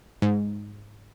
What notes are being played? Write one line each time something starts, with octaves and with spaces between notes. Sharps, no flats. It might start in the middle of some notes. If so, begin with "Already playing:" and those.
G#2